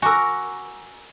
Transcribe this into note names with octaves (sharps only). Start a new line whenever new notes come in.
F#4 A#4 G#5 D6 E6